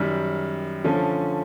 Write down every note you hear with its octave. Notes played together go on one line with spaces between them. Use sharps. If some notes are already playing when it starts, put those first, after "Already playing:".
Already playing: F#2 D#3 G3
D3 F3 A3 C#4